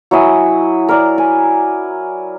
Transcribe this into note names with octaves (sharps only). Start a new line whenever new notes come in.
F#3 E4 D#5 G#5
A#4 D5
G#5